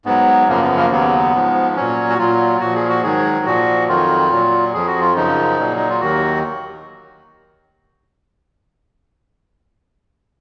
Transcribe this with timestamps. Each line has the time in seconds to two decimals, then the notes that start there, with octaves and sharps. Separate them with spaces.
0.05 G#2 F#3 B3
0.48 F#2 C#3 F3 A#3
0.62 B3
0.77 A#3
0.91 D#2 C#3 F#3 B3
1.34 G#2 F3
1.76 A#2 F#3 C#4
2.09 F#4
2.19 A#2 F#3 F4
2.60 A#2 F3 F#4
2.75 G#4
2.89 F#4
3.03 G#2 D#3 F#3 G#4
3.46 A#2 F3 F#4
3.88 F2 D#3 F#3 F4
4.31 A#2 F#3
4.74 F2 F3 G#4
4.87 F#4
5.01 F4
5.15 F#2 C#3 F3 D#4
5.59 A#2 F#3
5.77 D#4
5.90 F4
6.00 D#2 D#3 F#3 F#4